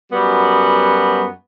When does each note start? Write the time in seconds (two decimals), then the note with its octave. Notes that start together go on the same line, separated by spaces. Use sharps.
0.11 F#2 G3 B3 F#4